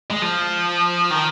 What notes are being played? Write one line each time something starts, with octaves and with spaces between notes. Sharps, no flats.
G#3
F3
D#3